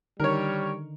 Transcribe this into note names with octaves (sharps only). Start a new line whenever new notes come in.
D3 D#3 G3 D#4 A#4 C#5